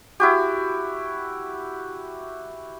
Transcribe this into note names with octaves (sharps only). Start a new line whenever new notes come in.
E4 F#4 G4